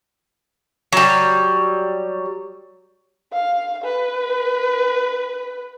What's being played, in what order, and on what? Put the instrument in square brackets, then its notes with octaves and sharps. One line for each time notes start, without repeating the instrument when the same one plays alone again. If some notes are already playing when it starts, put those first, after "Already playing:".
[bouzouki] F#3 G3
[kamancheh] F5
B4